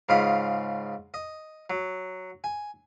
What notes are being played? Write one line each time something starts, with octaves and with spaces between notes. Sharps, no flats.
G#2 C#3 F4 D#5 B5
D#5
F#3
G#5